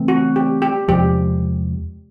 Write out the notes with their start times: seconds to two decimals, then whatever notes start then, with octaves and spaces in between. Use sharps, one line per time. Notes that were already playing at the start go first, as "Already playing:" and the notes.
Already playing: C#3 E3 A3 C4
0.08 F#4
0.36 G4
0.62 G4
0.88 E2 C3 F3 G#3 G4